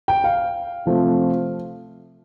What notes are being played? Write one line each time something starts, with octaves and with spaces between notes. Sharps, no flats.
G5
F5
C3 F3 A3